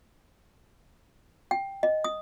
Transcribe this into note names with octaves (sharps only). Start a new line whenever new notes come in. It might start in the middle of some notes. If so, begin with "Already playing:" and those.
G5
D#5
D#6